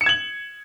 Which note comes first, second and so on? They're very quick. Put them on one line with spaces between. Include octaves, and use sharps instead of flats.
C#7 E7 G#6 F#7